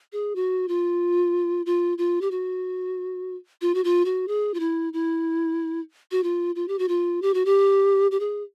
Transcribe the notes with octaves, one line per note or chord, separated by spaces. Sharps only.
G#4
F#4
F4
F4
F4
G4
F#4
F4
F#4
F4
F#4
G#4
F4
E4
E4
F#4
F4
F4
G4
F#4
F4
G4
F#4
G4
G4
G#4